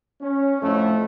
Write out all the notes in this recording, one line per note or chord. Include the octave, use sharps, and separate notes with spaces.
C#4
F2 A2 A3